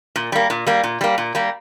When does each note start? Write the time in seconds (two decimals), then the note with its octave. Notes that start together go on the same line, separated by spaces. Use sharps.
0.16 A#2
0.32 G3 A#3
0.50 A#2
0.66 G3 A#3
0.83 A#2
1.01 G3 A#3
1.18 A#2
1.35 G3 A#3